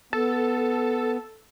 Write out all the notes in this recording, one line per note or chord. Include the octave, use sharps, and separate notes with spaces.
B3 A4